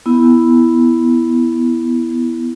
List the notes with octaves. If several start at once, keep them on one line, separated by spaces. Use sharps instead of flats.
B3 E4